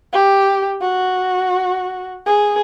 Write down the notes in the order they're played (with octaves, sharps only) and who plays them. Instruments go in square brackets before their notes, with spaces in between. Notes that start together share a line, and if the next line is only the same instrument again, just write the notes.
[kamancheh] G4
F#4
G#4